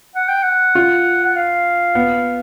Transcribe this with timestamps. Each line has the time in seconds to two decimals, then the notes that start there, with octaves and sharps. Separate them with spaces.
0.16 F#5
0.29 G5
0.43 F#5
0.75 F4
1.25 F#5
1.36 F5
1.95 B3